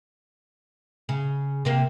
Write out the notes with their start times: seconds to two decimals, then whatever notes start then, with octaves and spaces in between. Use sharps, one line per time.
1.09 C#3
1.65 C3 A#3